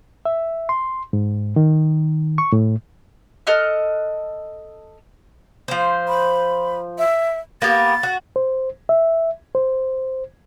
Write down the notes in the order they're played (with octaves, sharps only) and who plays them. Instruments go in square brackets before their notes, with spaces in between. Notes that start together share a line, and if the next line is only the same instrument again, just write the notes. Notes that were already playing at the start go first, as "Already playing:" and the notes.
[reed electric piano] E5
C6
G#2
D#3
C#6
A2
[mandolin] A4 D#5 F6 F#6
[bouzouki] F3 C5
[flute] B5
E5
[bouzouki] A#3 B3 G4 [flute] A6
[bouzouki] F#4
[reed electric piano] C5
E5
C5